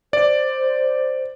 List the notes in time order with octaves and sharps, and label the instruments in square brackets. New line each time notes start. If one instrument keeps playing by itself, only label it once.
[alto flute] C5 [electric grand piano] D5